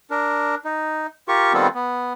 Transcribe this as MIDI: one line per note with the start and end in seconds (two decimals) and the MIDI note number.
0.11 0.55 62
0.11 0.55 70
0.65 1.07 63
1.28 1.53 65
1.28 1.53 67
1.28 1.53 70
1.28 1.53 85
1.54 1.68 51
1.54 1.68 55
1.54 1.68 59
1.54 1.68 60
1.54 1.68 65
1.54 1.68 69
1.75 2.13 59